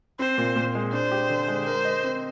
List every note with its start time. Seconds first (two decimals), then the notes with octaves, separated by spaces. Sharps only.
0.19 C4 C5
0.38 A#2
0.56 A#2
0.75 G#3
0.93 D4 C5
1.11 G4
1.30 D3
1.48 G#3
1.66 A#4 C5
1.85 D#5
2.04 C4